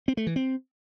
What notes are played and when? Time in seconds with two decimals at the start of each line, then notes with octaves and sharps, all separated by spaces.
0.08 C4
0.17 A3
0.27 E3
0.36 C4